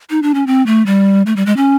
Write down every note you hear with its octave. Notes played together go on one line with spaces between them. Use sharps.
D#4
D4
C#4
C4
A3
G3
A3
G3
G#3
C#4